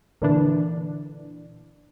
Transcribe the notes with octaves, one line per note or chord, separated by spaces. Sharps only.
A#2 D3 E3 D4